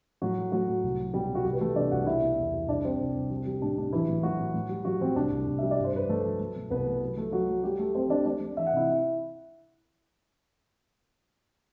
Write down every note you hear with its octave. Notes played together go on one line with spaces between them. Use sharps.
A2 F#3 F#4
A3
F#3 A3 F#4
A2
C2
F#3
B2 G3 G4
B2
F#4
C2 G3 G4
B4
E3 A3 A4
C3 D4 D5
C2 F#4 F#5
B2 E4 E5
B2
E2
G3
C2 D4 D5
G3 C4 C5
C2
C2
G3
G3
A2 D4
A2 D4
E3 F#3 E4
A2
F#3 A3 F#4
A2
A2
G3
F#3 G3 F#4
A2 C4
C2 D4
C2
C2
G3 E5
D5
G2
C5
G2 B4
G2 A3 A4
F#3
A3
B2
C2 B3 B4
A3
F#3
F#3 A3 A4
F#3 F#4
A3
G3 A3 G4
A3 A4
A3 C4 C5
A3 D4 D5
A3 D4 D5
A3
E3 E5
F#5
C3 E4 E5